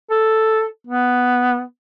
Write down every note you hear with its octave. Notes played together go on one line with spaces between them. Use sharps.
A4
B3